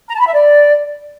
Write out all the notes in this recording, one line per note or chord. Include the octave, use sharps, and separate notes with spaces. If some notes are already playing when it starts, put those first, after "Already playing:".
A#5
A5
B5
E5
D5